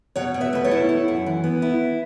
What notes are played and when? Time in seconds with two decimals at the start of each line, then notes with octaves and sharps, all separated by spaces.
0.16 B2 C#5 F#5
0.34 B2
0.41 B4 E5
0.53 A3 B4
0.64 A4 C#5
0.71 E4
0.89 E4
1.08 F#2
1.26 E3
1.44 B3
1.62 E4